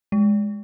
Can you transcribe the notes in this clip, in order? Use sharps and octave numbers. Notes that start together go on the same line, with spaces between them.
G#3